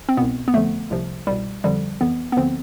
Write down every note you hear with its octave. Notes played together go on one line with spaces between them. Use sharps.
C4
C2 B2 B3
B3
F2 D3 F3 A3
C2 C3 F3
C2 B2 G3
F2 D3 F3 G3
F2 E3 B3
B3
D2 D3 F3 C4